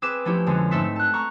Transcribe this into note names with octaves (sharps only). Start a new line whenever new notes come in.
C4 G#4 B4 D6 B6 E7
F3 A3 C#4 E4 G4
F2 D3 G#3 C#4
G#2 A3 C4 A4 E5 B6
A5 F#6
A#5 C#6